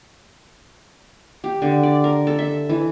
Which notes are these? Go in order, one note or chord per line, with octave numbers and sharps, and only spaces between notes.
G4
D3
D5
A#4
A4
E5
E3